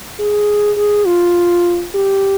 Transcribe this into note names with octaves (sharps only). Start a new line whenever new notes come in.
G#4
G#4
F4
G4